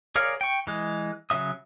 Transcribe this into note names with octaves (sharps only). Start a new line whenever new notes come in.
G#4 A#4 C#5 D5 F5
G5 C#6
E3 G#3
C#3 F#3 E5 D#6